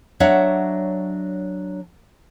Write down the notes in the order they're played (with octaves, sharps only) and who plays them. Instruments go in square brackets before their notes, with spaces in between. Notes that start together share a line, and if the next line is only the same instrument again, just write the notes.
[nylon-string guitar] F#3 D4 C#5 E5 F#5